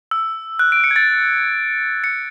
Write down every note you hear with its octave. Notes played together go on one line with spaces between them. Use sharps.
E6
F#6
D7
C#7
G#6
A6
C#7